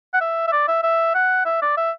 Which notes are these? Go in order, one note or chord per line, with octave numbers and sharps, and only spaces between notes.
F#5
E5
E5
D5
E5
E5
F#5
E5
D5
E5